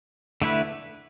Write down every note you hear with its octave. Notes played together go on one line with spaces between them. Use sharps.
D3 A3 E4 B4